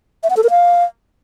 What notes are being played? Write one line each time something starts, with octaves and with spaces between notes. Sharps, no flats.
E5
F#5
A4
A#4
F5